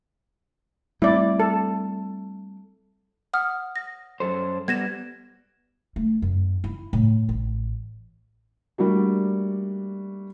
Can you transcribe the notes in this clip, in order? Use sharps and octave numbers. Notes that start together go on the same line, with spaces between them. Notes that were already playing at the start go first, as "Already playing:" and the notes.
G3 A3 C4 E4 D5
A4
F#5 D#6 F6
A#6
F#2 A4 C5
G3 B3 G#6 A#6 E7
A3
F#2
E4
A2
A1
G3 A3 A#3 D4 F#4